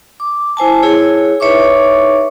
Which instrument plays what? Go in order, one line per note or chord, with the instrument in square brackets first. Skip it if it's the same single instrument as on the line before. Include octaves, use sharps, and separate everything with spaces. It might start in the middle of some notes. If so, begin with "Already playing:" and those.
[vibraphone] D6
E4 C5 G#5 A5
E4 G#4 C#5
D#4 B4 C#5 E5 C#6 D6